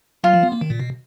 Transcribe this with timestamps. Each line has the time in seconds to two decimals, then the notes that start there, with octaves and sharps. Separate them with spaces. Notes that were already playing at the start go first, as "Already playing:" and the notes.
0.24 F#3 F4
0.33 F3
0.43 B3
0.52 A#3
0.61 D#3
0.70 A#2
0.80 B2